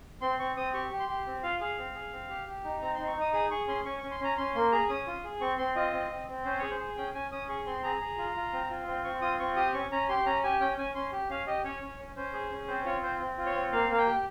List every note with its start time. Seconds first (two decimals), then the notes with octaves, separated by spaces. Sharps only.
0.22 C4 C6
0.39 C4 C#6
0.56 C4 D#6
0.74 G4 C#6
0.91 G4
1.00 C6
1.09 G4
1.26 C4
1.43 F4 F5
1.60 G#4 F5
1.78 C4
1.95 G#4
2.12 C4
2.30 G4
2.47 G4
2.64 D#4
2.82 C4 A#5
2.95 C6
2.99 D#4
3.07 C#6
3.16 D#4 D#6
3.33 G#4 D#6
3.50 G#4 C#6
3.68 C#4 C6
3.85 C#4 C#6
3.98 C#6
4.03 C#4
4.11 C6
4.20 C#4 A#5
4.37 C#4 C6
4.55 A#3 C6
4.72 G#4 A#5
4.89 C#4 D#6
5.07 F4
5.24 G#4
5.41 C4 C#6
5.58 C4 C6
5.76 F4 D#5
5.93 C4
6.11 C4
6.28 C4
6.44 C#4 C5
6.58 G#4 C#5
6.71 C5
6.80 G#4
6.97 C#4 G5
7.14 C#4 G#5
7.31 C#4 D#6
7.49 G#4 C#6
7.66 C4 C6
7.83 G#4 A#5
8.01 G#4
8.18 F4
8.36 F4
8.53 C4
8.70 F4
8.87 C4
9.04 C4 C#6
9.22 F4 D#6
9.40 C4 C#6
9.56 G4 D#6
9.74 C#4 C#6
9.92 C#4 A#5
10.09 G4 C6
10.26 C#4 A#5
10.43 G4 G#5
10.61 C#4 G5
10.78 C#4 G#5
10.95 C#4 C6
11.12 G4
11.29 C#4 F5
11.47 G4 D#5
11.64 C#4 C#5
11.81 C#4
11.99 C#4
12.16 C#4 C5
12.33 G#4
12.51 C#4
12.68 C4 C5
12.85 F4 C#5
13.03 C4 C5
13.20 C4
13.37 F4
13.46 C#5
13.55 C4
13.72 A#3 F5
13.89 A#3 F5
13.98 G5
14.07 G4